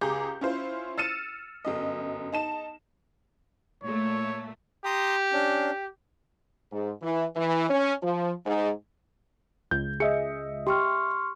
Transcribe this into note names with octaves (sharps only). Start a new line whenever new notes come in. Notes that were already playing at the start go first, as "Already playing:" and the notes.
C#2 G4 G#4 A#5 D6 G6
C#4 E4 F4 C5
E6 F6 A6 C#7 D#7 E7
G1 F#2 D#5
D#4 A5 E7
A#2 A3 C#5
G4 A#5 C6 D#6
C#4 D4
G#2
E3
E3
C#4
F3
G#2
C#2 G6
G#4 D#5 E5 C#7
G4 C6 C#6 F6